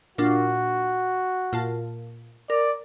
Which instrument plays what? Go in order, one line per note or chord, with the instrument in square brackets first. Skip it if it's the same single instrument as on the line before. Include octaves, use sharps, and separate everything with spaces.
[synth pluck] A#2 D4 F4 [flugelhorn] F#4
[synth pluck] A#2 F4 A5
[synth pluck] A#4 [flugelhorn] D5